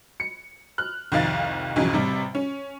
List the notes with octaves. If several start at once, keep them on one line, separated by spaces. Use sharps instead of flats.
C#7
F6 F#6
C2 F2 D#3 F5 A6
B1 F2 C#3 E3 F#3
A1 C3 G3
C#4